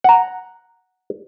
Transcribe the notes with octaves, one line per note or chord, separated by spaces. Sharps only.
F#5 A#5